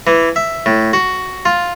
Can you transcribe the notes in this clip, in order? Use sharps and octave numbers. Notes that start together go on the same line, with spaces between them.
E3
E5
A2
F#4
F4